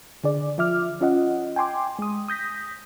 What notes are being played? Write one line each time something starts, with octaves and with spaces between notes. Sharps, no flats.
D3 G#4 D5
F3 F4 E5 D6 F6
C#4 F4 D#5 F#5
G5 G#5 C6 D6
G#3 D#6
D#6 G6 A#6 B6